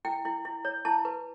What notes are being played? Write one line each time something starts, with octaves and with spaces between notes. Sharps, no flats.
E4 G5
E4
E4
C#5
E4 A5
B4